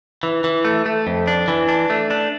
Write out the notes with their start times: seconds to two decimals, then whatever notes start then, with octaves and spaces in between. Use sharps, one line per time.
0.23 E3
0.44 E3
0.65 A3
0.86 A3
1.07 F2
1.27 D4
1.48 E3
1.69 D4
1.90 A3
2.11 D4